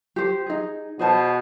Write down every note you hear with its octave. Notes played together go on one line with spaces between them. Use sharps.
G4 C5
D#4 G#4
B2 G#4 C5 A5